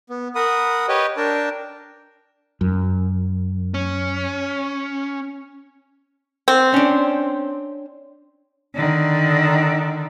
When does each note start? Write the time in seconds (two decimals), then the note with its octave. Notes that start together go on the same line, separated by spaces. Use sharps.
0.10 B3
0.35 A#4 F#5 B5 D#6
0.88 G4 B4 C#5 D#5 G5
1.17 D4 A#4 G5 A5
2.61 F#2
3.74 C#4
6.48 C4
6.74 C#4 D4
8.75 D3 D#3